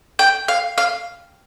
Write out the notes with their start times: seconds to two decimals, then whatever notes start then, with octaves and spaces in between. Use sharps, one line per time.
0.19 G5
0.48 F5
0.78 F5